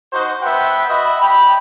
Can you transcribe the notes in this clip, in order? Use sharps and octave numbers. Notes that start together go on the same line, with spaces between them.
D#4 F#4 C5
B3 B4 C5 E5 F#5 G5
F#4 D#5 E5 B5
G5 B5